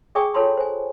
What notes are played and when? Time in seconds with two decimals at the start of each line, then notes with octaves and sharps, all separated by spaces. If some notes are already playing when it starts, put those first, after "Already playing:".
0.15 G#4 D5 G5 G#5 C#6 D#6
0.34 F4 A4 C#5 A5 B5 C6
0.57 C5 G#5